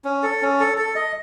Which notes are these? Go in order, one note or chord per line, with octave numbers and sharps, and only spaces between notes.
C#4
A4
C#4
A4
A4
D#5